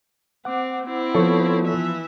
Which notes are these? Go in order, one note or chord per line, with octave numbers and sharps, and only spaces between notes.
C4 F#5 D6
C4 E4
F3 B3 A4 C#5 C#6
E3 E5